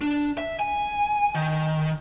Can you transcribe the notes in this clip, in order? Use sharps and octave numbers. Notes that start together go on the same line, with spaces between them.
D4
E5
G#5
D#3